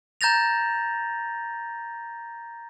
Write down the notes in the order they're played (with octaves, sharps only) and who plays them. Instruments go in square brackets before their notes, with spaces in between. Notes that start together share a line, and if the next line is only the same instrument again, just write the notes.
[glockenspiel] A#5 G6 A6 A#6 F7